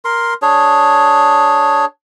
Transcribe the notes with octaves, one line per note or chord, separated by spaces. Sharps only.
A#4 C6
D4 G#4 C#5